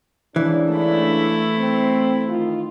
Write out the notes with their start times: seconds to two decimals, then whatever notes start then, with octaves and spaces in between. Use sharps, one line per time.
0.36 G#2 C#3 E3 D4
0.73 A3 E4
1.58 C4
2.29 D#3 F4